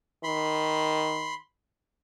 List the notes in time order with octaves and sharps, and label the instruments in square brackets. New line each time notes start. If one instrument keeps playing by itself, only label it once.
[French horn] D#3 [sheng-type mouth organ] B5 C6